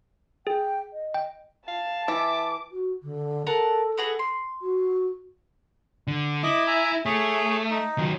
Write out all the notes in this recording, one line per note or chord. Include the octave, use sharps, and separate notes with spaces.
G#4 G5
D#5
G5
F5 A5
E3 E5 D6
F#4
D3
A4 A#4 F#5 A5
B3 F#4 G#4
C6
F#4
D3
E4 D#5 D6
E5 G#5 A#5
A3 G#4 C#5
D#4
D#3 F#3